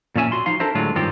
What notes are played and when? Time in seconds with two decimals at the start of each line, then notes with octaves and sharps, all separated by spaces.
0.16 A#2 F3 C#4 E5 G#5
0.32 F#4 C6
0.46 F3 D#4 F5 C6
0.60 D4 A4 A#4 C5 E5
0.75 A2 D3 F#3 G#3 F4
0.95 G2 D#3 F3 C4 F4 G4